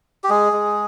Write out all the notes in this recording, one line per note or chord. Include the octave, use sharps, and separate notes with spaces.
G4
G#3 G#4
G#3